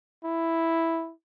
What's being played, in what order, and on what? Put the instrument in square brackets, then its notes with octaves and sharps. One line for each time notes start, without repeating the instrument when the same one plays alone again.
[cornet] E4